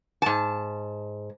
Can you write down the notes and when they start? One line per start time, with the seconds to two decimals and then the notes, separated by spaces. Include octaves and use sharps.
0.22 G#2 A5